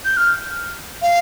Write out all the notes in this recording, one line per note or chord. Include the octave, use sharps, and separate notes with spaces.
G6
F6
F5